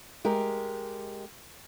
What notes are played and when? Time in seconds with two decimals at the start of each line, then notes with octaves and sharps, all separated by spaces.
0.25 G#3 G4 A#4